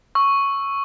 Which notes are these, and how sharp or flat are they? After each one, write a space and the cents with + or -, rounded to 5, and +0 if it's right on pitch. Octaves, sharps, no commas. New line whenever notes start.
C#6 +0 E6 +0